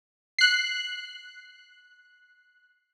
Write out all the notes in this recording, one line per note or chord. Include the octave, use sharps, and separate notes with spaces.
F#6 C7